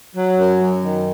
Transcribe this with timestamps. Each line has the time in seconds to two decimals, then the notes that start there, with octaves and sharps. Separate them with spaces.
0.16 F#3
0.38 F#2
0.61 F#2
0.84 D#3